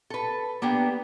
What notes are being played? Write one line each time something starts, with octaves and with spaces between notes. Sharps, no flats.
A4 B4
A#3 B3 D4 G4